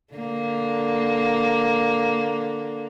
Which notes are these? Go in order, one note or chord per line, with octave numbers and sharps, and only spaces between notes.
D3 A#3